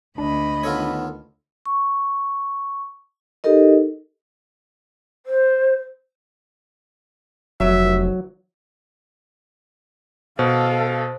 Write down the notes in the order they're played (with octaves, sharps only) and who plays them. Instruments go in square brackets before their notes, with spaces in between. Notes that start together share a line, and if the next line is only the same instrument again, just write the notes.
[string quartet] D2 D#5 B5 [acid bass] D4
[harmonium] D#3 B3 [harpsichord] F4 A4 C#5
[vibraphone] C#6
D#4 G4 A4 A#4 D#5
[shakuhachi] C5
[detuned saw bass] F1 [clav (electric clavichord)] F#3 [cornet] E5
[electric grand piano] B2 [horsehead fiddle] A4 F5 [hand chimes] C5